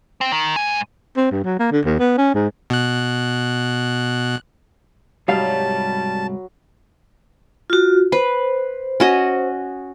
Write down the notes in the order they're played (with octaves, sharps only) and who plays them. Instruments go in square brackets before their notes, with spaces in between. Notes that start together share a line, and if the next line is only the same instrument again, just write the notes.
[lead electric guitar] C4
D#3
G#2 G#5
[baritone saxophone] C4
G2
F#3
A#3
D3
D#2
B3
C#4
G#2
[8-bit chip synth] B2 F#6
[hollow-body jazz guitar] C2 G#2 F5 [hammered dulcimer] F#3 [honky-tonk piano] G3 [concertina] A5
[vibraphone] F4 F#4
[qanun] B4 [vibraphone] C5
[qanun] C#4 F#4 D#5